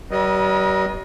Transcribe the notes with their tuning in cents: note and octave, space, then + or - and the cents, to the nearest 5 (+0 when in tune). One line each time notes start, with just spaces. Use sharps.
G3 -45 B4 -45 D#5 +0